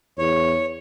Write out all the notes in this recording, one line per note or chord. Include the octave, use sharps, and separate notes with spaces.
E2 C#5